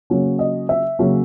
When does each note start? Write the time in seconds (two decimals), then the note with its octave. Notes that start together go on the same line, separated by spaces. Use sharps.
0.10 C#3 F#3 A#3 C#4
0.39 D#5
0.69 E5
0.99 C#3 F#3 A#3 C#4